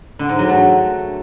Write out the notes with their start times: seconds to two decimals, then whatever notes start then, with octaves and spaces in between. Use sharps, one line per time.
0.19 D3
0.29 G#2
0.39 F#3
0.49 A3